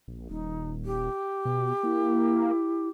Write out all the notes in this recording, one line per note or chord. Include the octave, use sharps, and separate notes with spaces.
A#1
D#1 D#4
G4
B2
A#3 E4